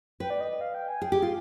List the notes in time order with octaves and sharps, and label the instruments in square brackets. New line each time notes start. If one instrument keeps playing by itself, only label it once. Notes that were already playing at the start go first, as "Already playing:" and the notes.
[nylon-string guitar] B4 [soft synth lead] G5
[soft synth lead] D5
D#5
D#5
F5
G5
G#5
[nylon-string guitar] G#4 [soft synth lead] G5
[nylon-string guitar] G4 [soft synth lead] G#4
[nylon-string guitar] F4